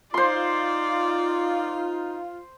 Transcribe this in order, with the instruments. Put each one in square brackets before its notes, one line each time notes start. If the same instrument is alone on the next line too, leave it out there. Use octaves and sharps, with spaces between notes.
[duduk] D#4 [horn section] F4 [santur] C5 C6 [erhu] D5